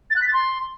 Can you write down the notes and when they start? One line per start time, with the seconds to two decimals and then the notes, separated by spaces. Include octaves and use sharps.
0.10 A6
0.16 F#6
0.22 B6
0.27 A6
0.33 C6